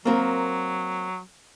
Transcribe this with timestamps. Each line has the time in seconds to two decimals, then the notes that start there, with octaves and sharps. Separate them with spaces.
0.05 F#3 A#3 C4 A#4